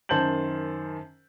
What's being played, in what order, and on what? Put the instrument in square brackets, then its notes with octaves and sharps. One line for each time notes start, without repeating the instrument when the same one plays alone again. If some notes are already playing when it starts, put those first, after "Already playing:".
[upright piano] F#2 D#3 C5 A5 G6 F#7